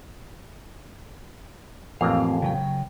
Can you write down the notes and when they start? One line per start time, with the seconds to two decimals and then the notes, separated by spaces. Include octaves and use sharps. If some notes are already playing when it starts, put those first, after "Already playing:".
2.01 A1 F2 A#3 C4 F5
2.42 C#3 F#3 G5